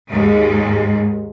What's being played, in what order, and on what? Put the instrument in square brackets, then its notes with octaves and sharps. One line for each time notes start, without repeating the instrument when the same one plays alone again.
[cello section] D#2 G#2 G#3